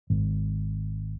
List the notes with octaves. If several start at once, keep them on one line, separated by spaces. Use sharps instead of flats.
G#1